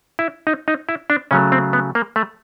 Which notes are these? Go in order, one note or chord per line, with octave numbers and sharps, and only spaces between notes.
E4
D#4
D#4
E4
D4
C#3 F#3 A3 C#4
C4
B3
A#3
A3